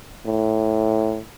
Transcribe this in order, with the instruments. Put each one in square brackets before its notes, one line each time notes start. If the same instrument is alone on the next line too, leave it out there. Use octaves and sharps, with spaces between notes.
[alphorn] A2